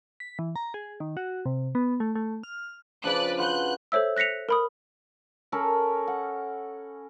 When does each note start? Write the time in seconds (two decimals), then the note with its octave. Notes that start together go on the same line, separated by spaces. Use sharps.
0.20 B6
0.39 E3
0.56 A#5
0.74 G#4
1.00 D#3
1.17 F#4
1.46 C3
1.75 B3
2.00 A3
2.15 A3
2.43 F6
3.03 C#3 F3 D4 B4 D5 F#6
3.38 F4 F#4 B4 F#6 G6
3.92 A4 C5 C#5 E5 E6
4.16 F#6 A#6 B6 C#7 F7
4.49 A#4 B5 D#6
5.52 C#4 A4 A#4 B5
6.07 F#5